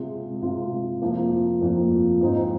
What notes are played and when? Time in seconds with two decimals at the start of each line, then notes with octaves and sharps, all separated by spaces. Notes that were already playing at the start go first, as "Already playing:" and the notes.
Already playing: C3 G#3 F4
0.42 C3 G#3 F4
1.02 F2 F3 A#3
1.61 F2 F3 A#3
2.21 G#2 F3 C4 D#4